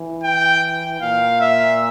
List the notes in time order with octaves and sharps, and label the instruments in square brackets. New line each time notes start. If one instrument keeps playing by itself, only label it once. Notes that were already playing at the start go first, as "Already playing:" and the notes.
Already playing: [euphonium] E3
[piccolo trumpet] G5
[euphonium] A#2 [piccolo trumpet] F5
[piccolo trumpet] E5